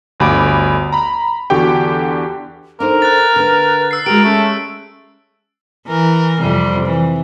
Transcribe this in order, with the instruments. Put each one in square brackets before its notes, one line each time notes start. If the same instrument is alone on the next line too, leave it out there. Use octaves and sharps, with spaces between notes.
[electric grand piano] G1 D2 G3 B5 D6 D7
A#5 B5
E2 D3 F#4 G4 G5
[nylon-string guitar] D4 D#4 C5 [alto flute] A4 [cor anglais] A#4
[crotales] F#6 A6
[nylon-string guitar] D3 D4 [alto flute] B4
[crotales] E6 C7
[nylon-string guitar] G#3 G4 [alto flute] F#4 [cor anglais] A#4 [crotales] D7
[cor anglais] A3 [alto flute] C#4
[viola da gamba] E3 A#4
F2 C3 G3
E3